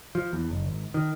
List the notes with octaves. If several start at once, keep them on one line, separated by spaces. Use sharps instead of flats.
F3
E2
F#1
G#1
D#3